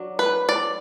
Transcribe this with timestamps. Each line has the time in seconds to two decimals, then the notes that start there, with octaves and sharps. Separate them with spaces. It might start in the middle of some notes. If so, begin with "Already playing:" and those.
Already playing: F#3 D4
0.19 B4
0.49 D5